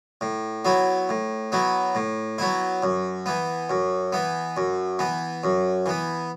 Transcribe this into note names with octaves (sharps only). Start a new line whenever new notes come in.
A2
F#3 B3 E4
A2
F#3 B3 E4
A2
F#3 B3 E4
F#2
E3 B3
F#2
E3 B3
F#2
E3 B3
F#2
E3 B3